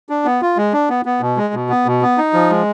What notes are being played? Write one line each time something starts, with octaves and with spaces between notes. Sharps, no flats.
D4
B3
F4
G#3
D4
B3
B3
B2
G#3
B2
B3
B2
B3
D#4
F3
G#3